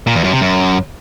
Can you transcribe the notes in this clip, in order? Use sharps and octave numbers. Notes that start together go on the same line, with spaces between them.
A#2
E2
F#2
C3
F#2